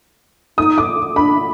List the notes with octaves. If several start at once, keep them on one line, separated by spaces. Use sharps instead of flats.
D#4 D#6
D6
D4 B5